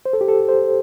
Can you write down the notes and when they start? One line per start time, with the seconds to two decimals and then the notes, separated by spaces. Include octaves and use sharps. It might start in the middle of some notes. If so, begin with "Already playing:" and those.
0.06 C5
0.13 A4
0.21 G4
0.28 A4
0.49 C5